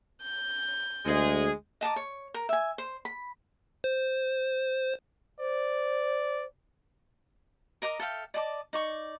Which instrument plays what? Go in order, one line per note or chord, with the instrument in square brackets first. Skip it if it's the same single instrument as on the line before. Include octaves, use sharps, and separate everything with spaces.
[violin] G6
[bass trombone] D2 [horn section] G#3 G#4
[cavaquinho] D#5 A5 A#5 D6
C#5
A#4
E5 G#5
C5
B5
[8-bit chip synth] C5
[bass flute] C5 [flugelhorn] D5
[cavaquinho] A#4 D#5 A#5 D6
A4 E5 F5 G5
D5 D#5 A5 D6
D#4 D5 C#6